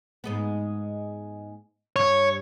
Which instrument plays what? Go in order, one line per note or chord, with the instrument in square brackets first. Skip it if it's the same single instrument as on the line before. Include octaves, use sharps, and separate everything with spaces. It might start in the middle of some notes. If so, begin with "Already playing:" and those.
[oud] G#2 G#3 B3
[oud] G2 [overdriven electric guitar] C#5